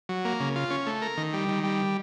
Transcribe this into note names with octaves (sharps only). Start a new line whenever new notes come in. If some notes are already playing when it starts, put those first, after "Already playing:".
F#3
A#3
C#3
F4
C#4
A3
A#4
D#3
G3
D#3
G3